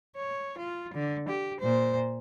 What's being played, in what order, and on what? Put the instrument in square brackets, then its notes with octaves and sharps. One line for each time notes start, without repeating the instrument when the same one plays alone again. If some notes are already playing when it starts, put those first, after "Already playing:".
[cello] C#5
F4
D3
G4
A#2 C5